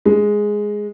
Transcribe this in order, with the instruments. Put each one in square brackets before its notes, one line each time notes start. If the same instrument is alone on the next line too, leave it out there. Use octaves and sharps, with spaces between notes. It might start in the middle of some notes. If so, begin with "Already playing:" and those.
[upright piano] G#3